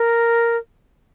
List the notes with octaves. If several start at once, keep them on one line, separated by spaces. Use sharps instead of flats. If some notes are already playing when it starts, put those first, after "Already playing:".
Already playing: A#4